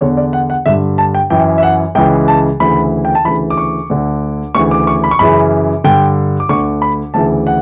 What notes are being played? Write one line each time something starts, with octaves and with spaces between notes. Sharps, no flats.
E2 D3 C#5
D5
F#5
F#5
G2 D3 E5
A5
G5
F#2 E3 G5
E5
F#5
C#2 C#3 E3 G5
A5
D2 C#3 E3 B5
G5
A5
D2 C#3 E3 B5
D6
C#6
D2 D3
D2 C#3 E3 C#6
D6
C#6
B5
C#6
F#2 C#3 E3 B5
G2 D3 G5
D6
D2 D3 C#6
B5
D2 C#3 E3 A5
F#5